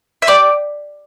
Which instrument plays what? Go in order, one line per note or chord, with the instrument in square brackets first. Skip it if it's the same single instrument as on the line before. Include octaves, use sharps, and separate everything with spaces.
[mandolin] E5
G4 D5